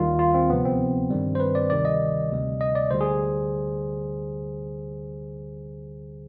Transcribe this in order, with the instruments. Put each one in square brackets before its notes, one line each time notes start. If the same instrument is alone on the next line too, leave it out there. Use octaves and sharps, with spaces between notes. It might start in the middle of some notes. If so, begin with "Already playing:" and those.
Already playing: [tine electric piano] D#2 D#3 G3 F4
F4
C4
D2 C3 F3 B3
C4
G2 D#3 G3
C5
B4
D5
D2 C3 D#3 G3 D5
D#5
D2 C3 G3
D#5
D5
D2 D3 G3 C5
G#4